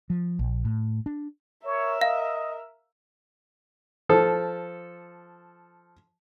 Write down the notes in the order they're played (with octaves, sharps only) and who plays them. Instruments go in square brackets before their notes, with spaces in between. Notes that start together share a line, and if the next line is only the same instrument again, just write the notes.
[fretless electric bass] F3
A#1
A2
D4
[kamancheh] A#4 E5 [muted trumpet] C#5
[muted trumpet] D#5 [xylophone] F5
[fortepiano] F3 A4